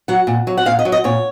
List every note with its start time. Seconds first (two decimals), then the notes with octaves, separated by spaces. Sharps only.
0.08 F#3 F#5
0.27 A#2
0.47 F#3
0.58 F#5
0.65 A#2 F5
0.79 D#5
0.85 F#3
0.92 D#5
1.04 A#2 C#5